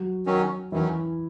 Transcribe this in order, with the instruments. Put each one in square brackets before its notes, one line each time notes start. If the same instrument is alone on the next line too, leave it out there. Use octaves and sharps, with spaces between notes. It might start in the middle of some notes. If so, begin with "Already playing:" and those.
Already playing: [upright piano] F#3 F#4
[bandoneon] D#3 F#3 C#4
[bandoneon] D#3 F#3 C#4 [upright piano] E3 E4